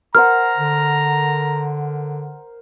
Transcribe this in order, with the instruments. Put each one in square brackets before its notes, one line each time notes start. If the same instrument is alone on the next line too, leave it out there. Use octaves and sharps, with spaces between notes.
[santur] A#4 C5 F#5 [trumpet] A#5 [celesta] F6
[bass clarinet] D3